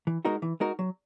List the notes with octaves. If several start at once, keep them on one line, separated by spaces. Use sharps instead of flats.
E3
G#3 D#4 F#4 A#4
E3
G#3 D#4 F#4 A#4
F#3